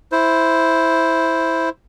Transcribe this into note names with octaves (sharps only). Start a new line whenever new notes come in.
E4 C5